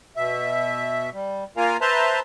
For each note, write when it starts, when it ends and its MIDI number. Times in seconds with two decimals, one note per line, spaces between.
0.16 1.10 47
0.16 1.10 76
1.13 1.44 55
1.57 1.77 58
1.57 1.77 65
1.57 1.77 70
1.57 1.77 77
1.57 1.77 80
1.57 1.77 82
1.81 2.20 71
1.81 2.20 72
1.81 2.20 76
1.81 2.20 81
1.81 2.20 82
1.81 2.20 84